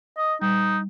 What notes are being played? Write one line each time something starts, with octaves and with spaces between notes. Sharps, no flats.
D#5
G3 D#4